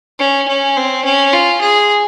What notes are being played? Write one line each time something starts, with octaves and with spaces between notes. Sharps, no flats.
C#4
C#4
C4
C#4
F4
G#4